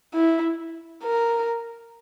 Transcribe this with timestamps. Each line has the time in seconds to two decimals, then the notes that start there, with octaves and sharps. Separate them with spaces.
0.14 E4
1.03 A#4